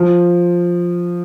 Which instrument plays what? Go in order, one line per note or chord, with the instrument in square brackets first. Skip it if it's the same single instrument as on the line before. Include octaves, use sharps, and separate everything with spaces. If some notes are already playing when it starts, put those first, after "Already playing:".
Already playing: [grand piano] F3